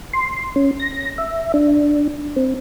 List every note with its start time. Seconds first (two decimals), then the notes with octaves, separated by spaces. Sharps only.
0.14 C6
0.56 C#4
0.80 A#6
1.18 E5
1.54 D4
2.36 C4